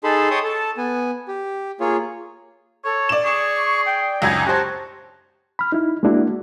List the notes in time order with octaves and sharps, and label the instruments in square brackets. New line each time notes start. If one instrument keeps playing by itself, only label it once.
[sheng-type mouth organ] D#4 G#4 A4 A5 B5 C6
C#5 G5 A5 C6 C#6 D#6
A4 A5
B3 G#5
G4
A#3 F4 G#4 C#5
[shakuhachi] A4 [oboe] C#5
[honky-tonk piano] D5 E7
[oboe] G#4 [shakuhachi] C#6
[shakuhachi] G5
[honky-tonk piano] C#2 F#2 G#6 [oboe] D#4
[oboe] F#4 [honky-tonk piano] G4 C5 [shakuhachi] A5
[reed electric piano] B5 F6
D#4 E4
G#3 A#3 D4 E4 F#4